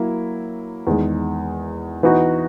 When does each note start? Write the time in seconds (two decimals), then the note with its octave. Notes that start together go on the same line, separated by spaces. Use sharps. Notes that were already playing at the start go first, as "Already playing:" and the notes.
Already playing: F#3 A#3 E4
0.87 E2 D#3 G#3
2.03 E3 B3 D#4 F#4